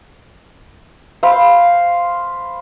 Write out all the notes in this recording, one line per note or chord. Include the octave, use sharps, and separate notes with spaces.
C5 F5 B5